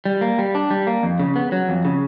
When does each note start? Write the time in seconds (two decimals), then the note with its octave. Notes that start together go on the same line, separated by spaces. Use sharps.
0.05 G3
0.21 A#3
0.39 G3
0.55 D4
0.71 G3
0.87 A#3
1.03 F2
1.20 C#3
1.36 B3
1.52 F#3
1.69 F2
1.85 C#3